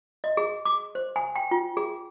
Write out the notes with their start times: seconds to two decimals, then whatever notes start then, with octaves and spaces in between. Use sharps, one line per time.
0.24 D#5
0.37 G#4
0.65 D6
0.95 C5
1.16 G#5
1.36 G5
1.51 F4
1.77 G#4